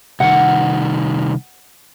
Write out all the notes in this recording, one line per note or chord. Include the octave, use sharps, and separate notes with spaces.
C2 D#3 F#5